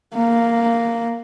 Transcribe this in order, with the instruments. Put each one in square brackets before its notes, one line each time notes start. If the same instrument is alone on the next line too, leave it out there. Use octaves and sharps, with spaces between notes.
[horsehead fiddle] A#3